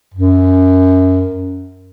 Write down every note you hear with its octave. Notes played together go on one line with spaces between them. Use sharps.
F#2